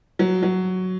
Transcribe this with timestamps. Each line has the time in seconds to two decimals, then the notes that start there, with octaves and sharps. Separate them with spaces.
0.19 F#3
0.43 F#3